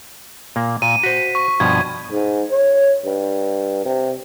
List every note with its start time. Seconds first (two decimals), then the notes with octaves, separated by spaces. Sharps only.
0.56 A#2 A#3
0.82 A#2 D#7
1.03 F#4 C5 B6
1.35 C#6
1.60 G2 B2 F3 G#6
2.12 G#2
2.51 C#5
3.05 G2
3.85 C3